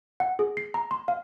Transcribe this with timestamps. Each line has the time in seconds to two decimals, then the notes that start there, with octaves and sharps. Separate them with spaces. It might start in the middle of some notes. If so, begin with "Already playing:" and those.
0.20 F#5
0.39 G#4
0.57 C7
0.74 A#5
0.91 C6
1.08 F5